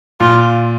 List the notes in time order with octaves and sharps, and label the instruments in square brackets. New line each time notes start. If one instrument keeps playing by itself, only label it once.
[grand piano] A#2 [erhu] F4